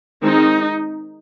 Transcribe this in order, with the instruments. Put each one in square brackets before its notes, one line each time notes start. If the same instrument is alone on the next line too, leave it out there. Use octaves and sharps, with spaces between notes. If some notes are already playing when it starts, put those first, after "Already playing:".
[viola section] D#3 G#3 C4 D#4